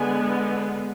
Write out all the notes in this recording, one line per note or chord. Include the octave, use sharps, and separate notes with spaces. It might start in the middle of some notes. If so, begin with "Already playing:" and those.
Already playing: D3 G#3 B3 G#5